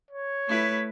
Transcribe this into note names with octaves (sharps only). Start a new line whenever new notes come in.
C#5
A3 E4 B4